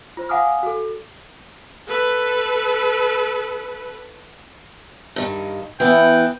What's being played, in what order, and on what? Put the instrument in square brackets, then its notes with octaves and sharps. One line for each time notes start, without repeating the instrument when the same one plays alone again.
[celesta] F4 C5
F5 F#5 G#5 D6 D#6 F6
F#4 A4
[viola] A4 B4
[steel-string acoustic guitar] G2 D#3
[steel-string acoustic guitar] E3 B3 [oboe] G5